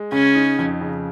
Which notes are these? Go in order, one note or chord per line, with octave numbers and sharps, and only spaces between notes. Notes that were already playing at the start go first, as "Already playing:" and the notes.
Already playing: G#3
C#3 C#4
D#4
F2
C#3